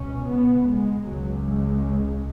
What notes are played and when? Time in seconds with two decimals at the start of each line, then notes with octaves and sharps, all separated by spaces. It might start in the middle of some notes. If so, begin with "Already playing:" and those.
Already playing: C#2 B2 C#4
0.28 B3
0.68 G#3
1.06 C#2 C#3 F#3
1.47 G#3